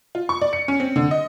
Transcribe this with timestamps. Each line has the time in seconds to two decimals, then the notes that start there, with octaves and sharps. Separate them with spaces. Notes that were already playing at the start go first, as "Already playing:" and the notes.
0.15 F4
0.29 C#6
0.42 D5
0.53 C#7
0.68 C#4
0.80 C4
0.96 D3
1.11 D#5